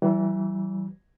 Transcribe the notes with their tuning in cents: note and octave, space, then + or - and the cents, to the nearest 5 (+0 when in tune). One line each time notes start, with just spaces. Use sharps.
E3 +0 G3 -40